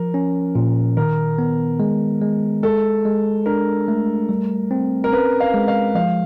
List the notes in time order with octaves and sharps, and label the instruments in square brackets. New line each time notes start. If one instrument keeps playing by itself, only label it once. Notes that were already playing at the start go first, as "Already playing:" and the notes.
Already playing: [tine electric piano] F3 [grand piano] A#4
[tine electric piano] C#4
A#2
[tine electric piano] D#3 [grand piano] A#4
[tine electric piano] B3
G#3
G#3
[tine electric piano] G#3 [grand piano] A4
[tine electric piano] G#3
[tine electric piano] D4 [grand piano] A#4
[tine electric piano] A3
G3
C4
[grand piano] A#4
[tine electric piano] C#4 [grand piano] B4
[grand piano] F5
[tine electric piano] G#3
[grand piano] F5
[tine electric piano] F3 [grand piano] F5